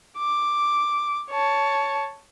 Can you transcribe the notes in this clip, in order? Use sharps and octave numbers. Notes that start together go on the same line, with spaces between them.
D6
C#5 A5